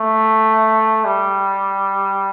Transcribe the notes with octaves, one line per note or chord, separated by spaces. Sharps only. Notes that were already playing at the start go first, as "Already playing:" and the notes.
Already playing: A3
G3